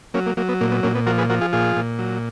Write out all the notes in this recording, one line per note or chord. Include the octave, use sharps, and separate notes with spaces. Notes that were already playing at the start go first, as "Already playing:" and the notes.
F#3 A#3 C#4
A#3
F#3 A#3
B3
A#2 A#3
B3
A#2 A#3 C#4
B3
F3 F#4 A#4
G#4 B4
F3 F#4 A#4
F4 G#4
A#2 F4 G#4
A#2
F#3